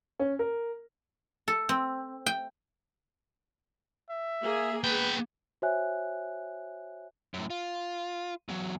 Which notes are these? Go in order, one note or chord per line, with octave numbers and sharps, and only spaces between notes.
C#4
A#4
A4
C4
G5
E5
A#3 G#4
B3 B4 G5
F#4 C5 C#5 E5 G#5 F#6
F#2 A2
F4
E2 F#3